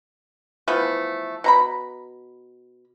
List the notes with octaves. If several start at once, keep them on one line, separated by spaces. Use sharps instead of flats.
E3 F3 A3 B3
B2 A#5 B5